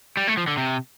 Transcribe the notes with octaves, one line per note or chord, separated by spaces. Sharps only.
G3
A3
F3
D3
C3